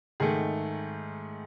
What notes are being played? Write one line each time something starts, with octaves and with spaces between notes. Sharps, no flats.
G#2 D#3 A3 G#4